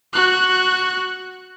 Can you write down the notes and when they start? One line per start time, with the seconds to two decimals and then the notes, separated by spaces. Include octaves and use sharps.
0.13 F#4 F#6